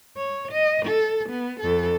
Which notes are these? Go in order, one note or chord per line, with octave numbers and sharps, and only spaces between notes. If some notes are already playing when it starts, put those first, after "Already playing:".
C#5
D#5
A4
B3
F2 A4